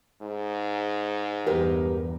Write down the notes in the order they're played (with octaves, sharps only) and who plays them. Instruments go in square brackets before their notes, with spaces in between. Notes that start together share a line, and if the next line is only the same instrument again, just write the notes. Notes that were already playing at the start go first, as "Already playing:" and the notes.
[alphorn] G#2
[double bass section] E2 G2 [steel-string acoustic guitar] G4 A#4 B4